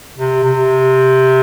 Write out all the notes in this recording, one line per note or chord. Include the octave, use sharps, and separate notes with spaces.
C3
C3